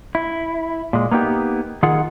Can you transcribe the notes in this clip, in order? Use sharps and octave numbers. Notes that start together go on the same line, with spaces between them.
E4
A#2 G#3
A#3 B3 D#4 G4
D#3 F4 G#4 F#5